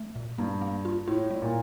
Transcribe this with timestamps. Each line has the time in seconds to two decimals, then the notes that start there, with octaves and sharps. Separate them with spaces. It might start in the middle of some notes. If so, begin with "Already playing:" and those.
Already playing: A3
0.16 A#2
0.38 G2 A#3
0.61 A#3
0.85 F4
1.08 A2 F4
1.31 G3
1.42 A#2